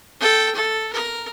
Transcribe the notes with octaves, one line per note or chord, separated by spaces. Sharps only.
A4 G5
A4
A#4